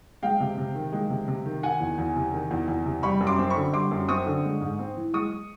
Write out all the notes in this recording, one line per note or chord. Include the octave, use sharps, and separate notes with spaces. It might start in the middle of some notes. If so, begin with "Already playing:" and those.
G#3 F5 G5
C3
C3
D#3
G#3
C3
C3
D#3
D#3 F#5 G#5
E2
E2
C3
D#3
E2
E2
C3
G3 B5 C#6
F#2
C6 D6
C4
B5 C#6
D3
G3 C6 D6
F#2
C4 C#6 D#6
D3
G#3
G#2
C4
E3
G#3 C#6 D#6